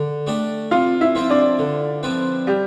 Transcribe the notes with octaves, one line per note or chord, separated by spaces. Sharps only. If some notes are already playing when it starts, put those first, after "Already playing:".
Already playing: D3
A3 D4 G4 D5
C3 F4 F5
E4 E5
F3 C4 F4 C5
D4 D5
D3
F3 C4 E4 B4
G3 G4